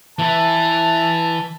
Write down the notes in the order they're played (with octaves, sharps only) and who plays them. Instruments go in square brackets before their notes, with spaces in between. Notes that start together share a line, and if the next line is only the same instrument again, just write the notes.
[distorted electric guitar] E3 E4 [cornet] A5